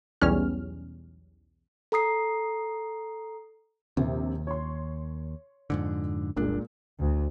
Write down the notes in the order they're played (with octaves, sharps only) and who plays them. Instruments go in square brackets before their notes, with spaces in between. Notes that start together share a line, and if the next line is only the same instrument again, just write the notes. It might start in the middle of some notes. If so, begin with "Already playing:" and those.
[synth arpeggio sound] B1 E2 G3 C#4 F6
[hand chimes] A4 A#5 D#6 C7
[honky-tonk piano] A#1 C3 [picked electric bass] D#2
[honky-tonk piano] C#5 C6
[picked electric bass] F2 G#2 D3
[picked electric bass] F1 C2 D4 [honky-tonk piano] A#2 G#3
[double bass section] D2